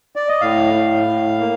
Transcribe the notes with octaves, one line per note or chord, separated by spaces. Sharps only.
D5
D#5
A2 F5
A2
A2
A#3